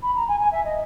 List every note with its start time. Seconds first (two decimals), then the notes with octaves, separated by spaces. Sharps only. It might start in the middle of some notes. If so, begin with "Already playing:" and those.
0.02 B5
0.16 A#5
0.28 G#5
0.40 G#5
0.52 E5
0.65 D#5